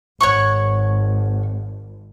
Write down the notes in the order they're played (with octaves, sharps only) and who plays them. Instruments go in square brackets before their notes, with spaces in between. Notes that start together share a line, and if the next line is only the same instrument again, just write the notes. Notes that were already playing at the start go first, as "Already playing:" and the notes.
[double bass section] G#1 [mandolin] C#5 F#5 C#6